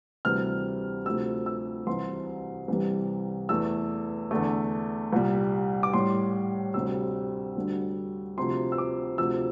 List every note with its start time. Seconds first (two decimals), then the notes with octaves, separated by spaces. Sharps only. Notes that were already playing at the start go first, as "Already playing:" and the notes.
0.25 D2 C3 E3 G3 F6
1.05 D2 C3 F3 A3 E6
1.46 E6
1.87 C2 C3 E3 C6
2.68 C2 C3 E3 G3
3.49 E2 E3 A3 E6
4.31 E2 D3 A3
5.13 C2 A#2 G3
5.83 D6
5.93 A2 G3 C6
6.74 D2 C3 G3 E6
7.56 D2 D3 G3
8.37 D2 C3 F3 C6
8.72 E6
8.78 D6
9.18 D2 C3 F3 E6